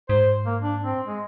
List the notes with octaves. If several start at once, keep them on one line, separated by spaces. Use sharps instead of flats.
G#2 C5
A#3
D4
C4
G#3